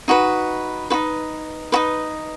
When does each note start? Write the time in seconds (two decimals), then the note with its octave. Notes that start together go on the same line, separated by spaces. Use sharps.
0.08 D#4 F#4 B4
0.90 D#4 F#4 B4
1.72 D#4 F#4 B4